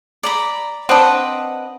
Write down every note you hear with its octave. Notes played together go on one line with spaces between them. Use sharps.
D5 A#5 B5
C4 D4 B4 D#5 F#5